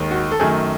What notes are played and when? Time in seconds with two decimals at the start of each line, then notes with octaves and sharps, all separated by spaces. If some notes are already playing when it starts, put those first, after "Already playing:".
Already playing: D#2 D#3 G#3
0.11 F#4
0.32 A4
0.40 F#2 D#3 F#3 A3 G#4